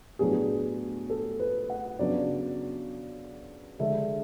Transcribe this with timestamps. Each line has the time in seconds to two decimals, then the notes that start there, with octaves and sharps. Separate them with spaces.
0.19 A2 F#3 B3 D4 G#4
1.10 A4
1.40 B4
1.70 F#5
1.99 C#3 F#3 B3 D4 D5
3.79 D3 G#3 D4 E5